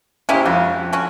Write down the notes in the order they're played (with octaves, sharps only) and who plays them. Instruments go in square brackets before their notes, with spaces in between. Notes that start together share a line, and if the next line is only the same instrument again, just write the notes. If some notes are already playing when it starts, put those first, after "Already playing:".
[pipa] G#3 A#3 E4 [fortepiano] C#4 G4 C5
[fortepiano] F2 [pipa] F#4
[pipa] D3 C#4 F#4